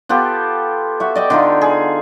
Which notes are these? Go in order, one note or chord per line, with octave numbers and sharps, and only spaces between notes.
B3 F4 G4 A4
F#4 E5
D5 D#5 G5
D3 D#4 F4
G#4